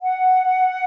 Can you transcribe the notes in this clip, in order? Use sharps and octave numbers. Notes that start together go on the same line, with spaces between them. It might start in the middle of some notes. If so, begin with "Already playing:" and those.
F#5